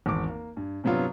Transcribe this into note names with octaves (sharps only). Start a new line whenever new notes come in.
G#1 E2 D6
A#3
G2
G2 C3 F#3 B3 F4